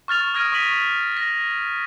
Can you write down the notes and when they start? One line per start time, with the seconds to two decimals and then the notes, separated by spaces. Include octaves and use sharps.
0.08 C#6 F6 A6 F7
0.34 D#6 F6 G#6 A#6 D7 D#7
0.52 C#6 D#6 B6 D#7 F#7
1.17 A#6